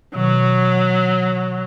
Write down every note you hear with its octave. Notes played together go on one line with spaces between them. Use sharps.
B2 D#3 F#3